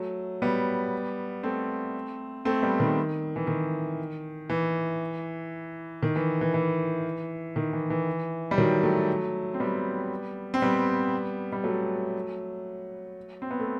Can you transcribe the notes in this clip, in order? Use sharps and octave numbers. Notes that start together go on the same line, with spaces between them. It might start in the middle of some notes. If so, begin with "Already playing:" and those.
Already playing: F#3 A3
G3 B3
A3 C4
A3 C4
G3 B3
D#3
E3
D#3
E3
D#3
E3
E3
E3
D#3
E3
E3
G3
D#3 F#3
F#3 A3
C4
G3 B3
C4
G3 B3
G3
F#3 A3
C4
B3
A3